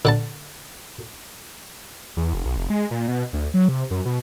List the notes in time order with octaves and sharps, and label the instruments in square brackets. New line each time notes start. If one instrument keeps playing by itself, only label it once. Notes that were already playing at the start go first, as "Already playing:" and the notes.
[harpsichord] D3 F#5 A5
[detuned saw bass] E2
F1
B1
F1
G#3
A#2
B2
D2
F#3
C3
F#2
B2